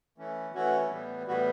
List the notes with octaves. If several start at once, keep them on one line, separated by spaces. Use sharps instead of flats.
E3 A3 C#4
E3 A3 C#4 F#4
A2 E3 G3 B3
A2 E3 G3 B3 F#4